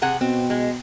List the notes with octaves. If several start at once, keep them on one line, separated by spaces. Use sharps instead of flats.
C3 G#4 F#5
B2 C4
G#3